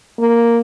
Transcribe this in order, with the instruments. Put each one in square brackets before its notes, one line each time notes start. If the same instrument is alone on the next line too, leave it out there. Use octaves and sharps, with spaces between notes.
[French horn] A#3